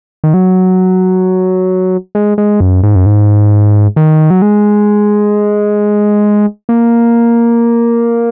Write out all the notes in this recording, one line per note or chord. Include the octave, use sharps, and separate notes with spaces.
D#3
F#3
G#3
G#3
F#2
G#2
F#2
G#2
D#3
F#3
G#3
A#3